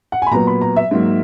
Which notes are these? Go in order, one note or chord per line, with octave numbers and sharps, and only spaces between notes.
F#5
G#5
B5
A#2 F#3 B3 A#5
B5
A#5
E5
G#2 F#3 A#3